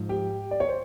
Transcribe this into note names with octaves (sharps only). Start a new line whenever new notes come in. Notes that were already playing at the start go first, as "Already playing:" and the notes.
Already playing: G#2 F3
G4
D5
C#5
C5